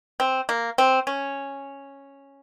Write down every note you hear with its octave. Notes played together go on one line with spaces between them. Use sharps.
C4
A#3
C4
C#4